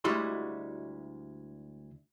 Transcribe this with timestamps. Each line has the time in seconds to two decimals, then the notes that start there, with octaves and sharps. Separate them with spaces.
0.04 D2 G3 G#3 E4 F#4 C6